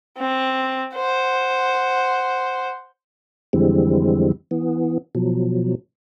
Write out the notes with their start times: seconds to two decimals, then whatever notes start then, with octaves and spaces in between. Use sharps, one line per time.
0.18 C4
0.95 C5 F#5
3.53 F2 D3 E3 G3 G#3 C4
4.51 E3 B3
5.15 B2 F3 F#3